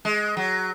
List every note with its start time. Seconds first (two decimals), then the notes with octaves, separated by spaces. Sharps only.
0.05 G#3
0.37 F#3